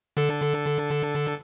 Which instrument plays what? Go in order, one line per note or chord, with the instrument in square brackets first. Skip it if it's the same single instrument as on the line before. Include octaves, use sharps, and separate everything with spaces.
[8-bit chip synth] D3 A4